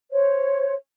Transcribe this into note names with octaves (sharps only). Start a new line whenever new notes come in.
C5 C#5